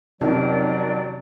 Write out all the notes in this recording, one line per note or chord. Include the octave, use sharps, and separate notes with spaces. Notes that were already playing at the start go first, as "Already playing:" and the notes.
F2 C3 D#3 F#3 C#4 D5